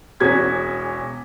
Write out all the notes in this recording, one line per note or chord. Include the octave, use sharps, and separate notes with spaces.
E1 E2 C#4 F#4 G#6 B6